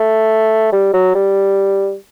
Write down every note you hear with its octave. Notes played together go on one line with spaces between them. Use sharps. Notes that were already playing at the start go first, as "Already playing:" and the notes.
Already playing: A3
G3
F#3
G3